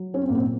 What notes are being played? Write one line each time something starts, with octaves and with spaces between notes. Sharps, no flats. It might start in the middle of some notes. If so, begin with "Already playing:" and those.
Already playing: F#3
C#4
C4
A#2 A#3
C4